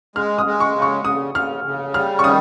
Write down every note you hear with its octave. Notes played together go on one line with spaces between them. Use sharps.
G#3 F6
D#6
G#3
C#6
C#3
C#6
C#3 D#6
C#3 F6
C#3
G3 F6
C#6
D#3 D#6